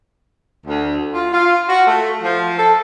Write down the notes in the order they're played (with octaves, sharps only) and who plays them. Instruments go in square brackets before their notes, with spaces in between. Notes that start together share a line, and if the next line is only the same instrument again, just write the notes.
[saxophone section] D2
F4
F4
F#4
A3
F3
A4